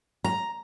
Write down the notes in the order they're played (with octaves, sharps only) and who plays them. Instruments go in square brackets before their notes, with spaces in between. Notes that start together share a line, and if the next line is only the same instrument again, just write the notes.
[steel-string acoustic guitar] A#5